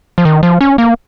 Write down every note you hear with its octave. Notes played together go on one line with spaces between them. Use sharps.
F3
D#3
F3
C#4
A#3